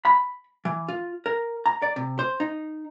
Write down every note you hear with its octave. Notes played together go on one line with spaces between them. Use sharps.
B5
E3
F4
A#4
A#5
D5
C3
C5
D#4